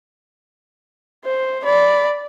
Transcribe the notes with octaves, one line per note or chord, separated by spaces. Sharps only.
C5
D5 B5